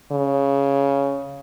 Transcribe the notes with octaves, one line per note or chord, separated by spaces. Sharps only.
C#3